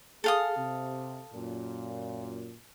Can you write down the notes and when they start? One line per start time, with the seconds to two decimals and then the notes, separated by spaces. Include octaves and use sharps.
0.24 G#4 A4 F5 D#6
0.56 C3
1.34 F#2 A#2